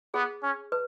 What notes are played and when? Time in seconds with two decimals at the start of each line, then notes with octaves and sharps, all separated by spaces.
0.14 B3 G#4
0.43 C#4
0.72 B4